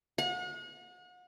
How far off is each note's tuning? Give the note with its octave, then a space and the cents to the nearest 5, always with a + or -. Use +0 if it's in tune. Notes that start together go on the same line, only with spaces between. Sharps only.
F#5 -40